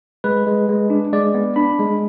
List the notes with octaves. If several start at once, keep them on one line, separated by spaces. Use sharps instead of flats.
G#3 B4
G#3
G#3
D4
G#3 D5
B3
D4 B5
G#3